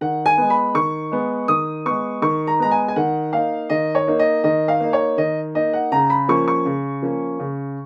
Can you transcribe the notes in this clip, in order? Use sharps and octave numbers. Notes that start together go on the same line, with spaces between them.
D#3 F#5
G#5
G#3 B3
B5
D#3 C#6
G#3 B3
D#3 D#6
G#3 B3 C#6
D#3 C#6
A#5
G#3 B3 A#5
G#5
G#5
D#3 F#5
A#3 D#4 F5
D#3 D#5
C#5
A#3 D#4
D#5
D#3 D#5
F5
A#3 D#4
C#5
D#3 D#5
A#3 D#4 D#5
F#5
C#3 A#5
B5
F3 A#3 C#4 C#6
C#6
C#3
F3 A#3 C#4
C#3